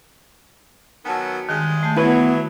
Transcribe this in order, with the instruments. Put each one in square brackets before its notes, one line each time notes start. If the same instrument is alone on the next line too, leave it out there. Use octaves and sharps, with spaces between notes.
[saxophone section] D#3 F#3 B3 [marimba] G#5 A5 E6
[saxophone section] G2 G#3 [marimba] D#3
[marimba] A3 A5 G6
[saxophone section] E3 F#3 [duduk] B3 [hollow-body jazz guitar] E4 B4 [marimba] G#6